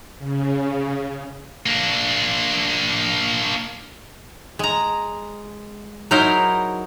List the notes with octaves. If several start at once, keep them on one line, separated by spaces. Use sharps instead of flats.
C#3
A#3 D4
G#3 A#5
F#3 D#4 E4 G#4 A#4 C5